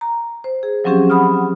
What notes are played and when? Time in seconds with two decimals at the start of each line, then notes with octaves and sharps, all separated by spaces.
0.01 A#5
0.44 C5
0.63 G#4
0.84 F3 F#3 C4 C#4 G4 G#4
1.10 F#5 B5 D#6 F6